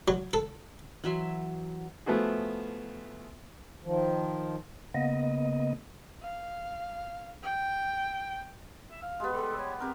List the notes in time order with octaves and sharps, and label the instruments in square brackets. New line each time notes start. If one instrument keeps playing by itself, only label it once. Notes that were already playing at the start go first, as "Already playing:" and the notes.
[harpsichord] F#3
A4
[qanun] E3 F#3 E5 C6
[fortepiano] F3 A3 B3 E4 F#4 G#4
[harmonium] D#3 F3
[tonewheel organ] C#3 A#3 B3 D#5
[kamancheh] F5
G5
[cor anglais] E5
F5
[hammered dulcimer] G#3 B3 [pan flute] G4
[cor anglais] G3 [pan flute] A4
[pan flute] C#5
[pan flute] C4 [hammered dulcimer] G4 A#4